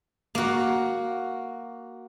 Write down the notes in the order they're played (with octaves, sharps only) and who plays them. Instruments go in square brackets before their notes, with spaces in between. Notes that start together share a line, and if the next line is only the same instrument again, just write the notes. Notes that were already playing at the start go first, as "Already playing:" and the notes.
[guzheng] A#3 F#4